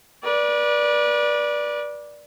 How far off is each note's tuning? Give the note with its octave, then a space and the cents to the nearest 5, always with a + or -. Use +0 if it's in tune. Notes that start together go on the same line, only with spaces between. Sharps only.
B4 -35 D5 +0